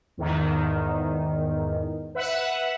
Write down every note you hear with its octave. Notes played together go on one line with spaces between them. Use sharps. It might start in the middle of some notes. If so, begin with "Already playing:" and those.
E2 G#2 D#3
B4 E5 F#5